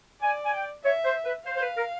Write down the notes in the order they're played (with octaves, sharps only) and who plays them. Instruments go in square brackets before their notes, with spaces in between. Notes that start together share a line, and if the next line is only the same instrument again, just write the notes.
[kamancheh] D5 [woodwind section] G#5
[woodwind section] G#5
G5
[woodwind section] C#5 [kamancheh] E5
[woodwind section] C5
B4
[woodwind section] C5 [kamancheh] F5
[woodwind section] C5
B4
A#4